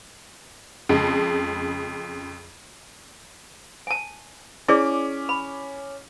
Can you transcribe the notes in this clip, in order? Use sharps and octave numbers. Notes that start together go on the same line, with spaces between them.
F2 C#3 G#3
G#5 A5
C#4 E4 G#4 D5 D6
B5